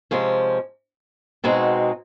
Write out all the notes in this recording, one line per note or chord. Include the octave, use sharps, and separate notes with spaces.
C3 F3 G#3 C#4
B2 G#3 C4 D#4 F#4